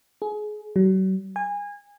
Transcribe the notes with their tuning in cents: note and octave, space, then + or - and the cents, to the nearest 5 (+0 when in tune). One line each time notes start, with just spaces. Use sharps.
G#4 +25
F#3 +40
G#5 -25